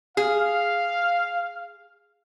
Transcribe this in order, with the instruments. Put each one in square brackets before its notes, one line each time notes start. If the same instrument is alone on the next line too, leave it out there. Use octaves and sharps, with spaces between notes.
[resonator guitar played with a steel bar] G#4 [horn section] F5